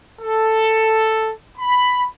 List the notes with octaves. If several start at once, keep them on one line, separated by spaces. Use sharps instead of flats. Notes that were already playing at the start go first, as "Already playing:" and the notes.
A4
B5